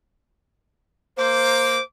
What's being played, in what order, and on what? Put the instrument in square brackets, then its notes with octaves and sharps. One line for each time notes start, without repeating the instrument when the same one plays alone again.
[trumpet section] A#3 D6 [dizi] C5